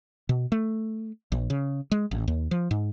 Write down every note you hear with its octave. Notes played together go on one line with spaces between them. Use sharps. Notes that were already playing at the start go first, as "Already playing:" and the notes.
B2
A3
A#1
C#3
G#3
A1
D#2
F3
G#2